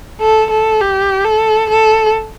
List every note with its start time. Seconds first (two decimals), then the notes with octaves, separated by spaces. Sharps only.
0.21 A4
0.50 A4
0.81 G4
1.24 A4
1.70 A4